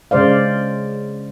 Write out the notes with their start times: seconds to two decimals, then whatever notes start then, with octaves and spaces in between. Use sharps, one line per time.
0.11 C#3 G#3 C5 D5 F5